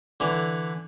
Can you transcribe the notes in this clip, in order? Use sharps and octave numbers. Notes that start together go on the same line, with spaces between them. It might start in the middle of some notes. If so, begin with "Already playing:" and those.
D3 E3